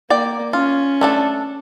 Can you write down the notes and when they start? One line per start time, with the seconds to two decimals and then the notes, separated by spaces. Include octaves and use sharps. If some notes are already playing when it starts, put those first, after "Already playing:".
0.10 A#3 D5 G5
0.53 C#4 F4
1.01 A3 D4 A4